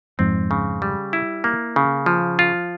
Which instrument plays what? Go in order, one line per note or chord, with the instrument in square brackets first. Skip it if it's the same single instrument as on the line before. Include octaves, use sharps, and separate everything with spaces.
[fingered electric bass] F2 G#2 [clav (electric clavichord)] C4
[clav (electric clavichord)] C#3
G3
E4
A#3
C#3
F3
F4